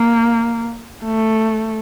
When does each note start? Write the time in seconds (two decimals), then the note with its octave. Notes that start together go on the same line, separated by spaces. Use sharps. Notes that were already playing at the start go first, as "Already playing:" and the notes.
Already playing: A#3
1.04 A3